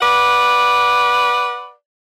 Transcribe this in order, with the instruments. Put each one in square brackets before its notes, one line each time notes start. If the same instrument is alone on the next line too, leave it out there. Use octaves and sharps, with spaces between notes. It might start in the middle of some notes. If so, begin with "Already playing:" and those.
[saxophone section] B4 D5 F#5